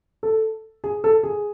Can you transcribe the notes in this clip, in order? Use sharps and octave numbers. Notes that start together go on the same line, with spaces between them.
A4
G#4
A4
G#4